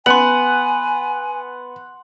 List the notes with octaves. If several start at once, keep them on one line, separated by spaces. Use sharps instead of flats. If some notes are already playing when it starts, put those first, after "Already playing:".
B3 F#5 G#5 C6 F#7